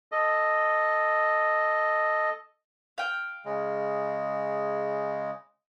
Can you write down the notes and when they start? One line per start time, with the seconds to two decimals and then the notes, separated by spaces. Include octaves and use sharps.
0.12 A4 D#5
2.98 F5 G5
3.45 C#3 G#3